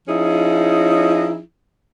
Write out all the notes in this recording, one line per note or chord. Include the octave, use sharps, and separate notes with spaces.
F3 C#4 D#4 E4 G#4